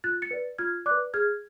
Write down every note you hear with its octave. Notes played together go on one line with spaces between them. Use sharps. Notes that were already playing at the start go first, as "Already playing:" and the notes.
F4 F#6 A6
A6 C#7
B4 D5
F4 F6 G#6
D5 D6 F#6
B4
G#4 F6 G#6